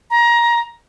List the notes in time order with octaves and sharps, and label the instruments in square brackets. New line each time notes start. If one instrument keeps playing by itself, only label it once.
[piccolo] A#5